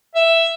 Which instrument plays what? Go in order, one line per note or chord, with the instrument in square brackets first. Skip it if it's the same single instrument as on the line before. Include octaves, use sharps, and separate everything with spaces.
[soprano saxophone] E5